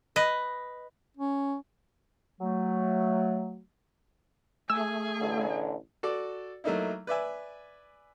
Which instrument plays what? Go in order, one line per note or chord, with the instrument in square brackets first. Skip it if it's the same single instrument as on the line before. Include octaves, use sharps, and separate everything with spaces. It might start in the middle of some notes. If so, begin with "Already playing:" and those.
[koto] B4 D#5
[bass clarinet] C#4
[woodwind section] F#3 A3
[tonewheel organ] A3 [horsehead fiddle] G#4 G#5 [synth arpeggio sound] E6
[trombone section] A1 D3
[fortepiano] F#4 A4 D5
F#3 A3 A#3 D#4 E4
B4 D5 E5 G#5